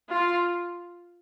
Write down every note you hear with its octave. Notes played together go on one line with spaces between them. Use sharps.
F4